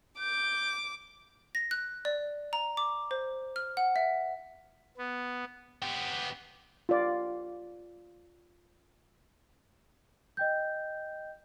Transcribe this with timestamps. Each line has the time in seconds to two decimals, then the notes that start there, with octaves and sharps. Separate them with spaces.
0.20 D6 G6
1.55 A#6
1.71 F#6
2.05 D5
2.53 A#5
2.77 D6
3.11 C5
3.56 F6
3.77 F#5
3.96 E5
4.98 B3
5.82 B3 G4
6.89 F4 D5
10.37 D#5 G5 G6